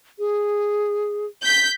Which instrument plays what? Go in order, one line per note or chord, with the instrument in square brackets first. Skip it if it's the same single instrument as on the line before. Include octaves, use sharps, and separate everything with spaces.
[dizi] G#4
[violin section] G6 B6